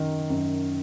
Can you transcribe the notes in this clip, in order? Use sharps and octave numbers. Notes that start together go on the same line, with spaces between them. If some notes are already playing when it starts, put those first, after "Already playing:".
Already playing: F#2 D#3
F#2